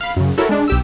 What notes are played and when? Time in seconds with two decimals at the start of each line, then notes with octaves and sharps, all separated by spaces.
0.01 F5 B5
0.16 F#2 C#3
0.38 E4 F#4 A4 A#4 C#5
0.49 G#3 D4
0.68 B1 G4 E6